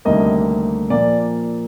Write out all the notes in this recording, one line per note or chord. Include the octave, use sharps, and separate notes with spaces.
D2 C3 D#3 G3 A#3 D#5
A#2 F3 A#3 D5